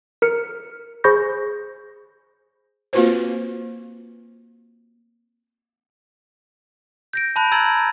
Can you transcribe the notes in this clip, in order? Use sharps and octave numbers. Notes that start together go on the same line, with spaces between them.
A#4 F6 C#7
G#4 C5 B5 C#6 G6 A#6
A#3 C4 F4 F#4 B4 C5
G6 A#6 D7
A5 B5 F#6
A#5 E6 G#6 A6 D#7 F#7